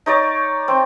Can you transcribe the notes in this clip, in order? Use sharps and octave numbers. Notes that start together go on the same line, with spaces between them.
D#4 C#5 D5 C#6
C4